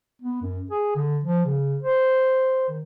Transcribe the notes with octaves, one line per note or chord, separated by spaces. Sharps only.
B3
F#2
G#4
D3
F3
C#3
C5
D#3